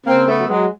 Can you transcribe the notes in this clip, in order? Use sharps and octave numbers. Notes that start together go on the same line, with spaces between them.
C#3 A#3 C4
A3 B3
F#3
F#3 G#3